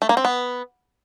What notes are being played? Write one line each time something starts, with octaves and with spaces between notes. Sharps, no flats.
A3
A#3
C4
B3